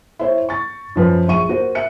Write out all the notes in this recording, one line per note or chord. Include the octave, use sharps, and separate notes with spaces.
E4 C5 C#5
C#6 A6
F#2 F3 B4
A#1 E5 C#6 D#7
A#3 F#4 C5
E5 F#6 C#7